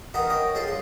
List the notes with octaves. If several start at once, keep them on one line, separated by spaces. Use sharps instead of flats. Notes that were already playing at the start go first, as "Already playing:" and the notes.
D#3 B3 F#4 A#4 D#5
C#5 D#5 G5
F2 C#4 G#4 A4 C6
G2 C6